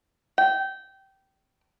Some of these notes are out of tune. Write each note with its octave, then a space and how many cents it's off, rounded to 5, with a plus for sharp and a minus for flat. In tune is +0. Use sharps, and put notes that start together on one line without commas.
G5 -20